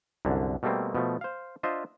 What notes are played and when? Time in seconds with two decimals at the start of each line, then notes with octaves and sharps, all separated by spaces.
0.25 C2 F#2 D3
0.63 B2 G3 A3 A#3 C4
0.95 B2 F3 A3
1.21 C5 F5
1.63 D4 F4 C5 D#5 E5